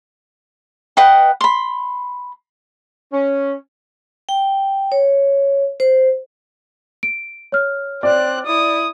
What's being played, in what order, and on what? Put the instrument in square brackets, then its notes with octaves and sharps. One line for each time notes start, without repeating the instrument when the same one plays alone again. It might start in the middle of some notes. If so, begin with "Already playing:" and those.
[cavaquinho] B4 D#5 F#5 G5
B5 C6
[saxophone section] C#4
[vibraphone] G5
C#5
C5
[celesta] D7
C#5 F6
[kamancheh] C4 F#6 [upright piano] D5
[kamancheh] E4 D#6